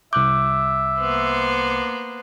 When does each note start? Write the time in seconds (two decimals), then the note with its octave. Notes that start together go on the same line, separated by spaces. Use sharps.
0.13 C2 E5 D6 F#6 G6
0.99 A#3 B3 C5